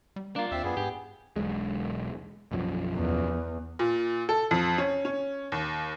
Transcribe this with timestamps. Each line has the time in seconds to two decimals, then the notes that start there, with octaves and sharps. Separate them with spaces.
0.16 G3
0.36 A#3 D4 F4
0.51 D#2 C4 E5 E6
0.64 F#2 B3 G#4
0.77 G#2 G4
1.36 E1 B1 G#3
2.52 B1 F#2 F3
2.95 E2
3.79 A#2
4.29 A4
4.51 F2
4.78 C#4
5.05 C#4
5.52 D#2